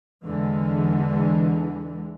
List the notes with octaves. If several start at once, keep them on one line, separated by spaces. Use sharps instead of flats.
E2 D3 E3 G#3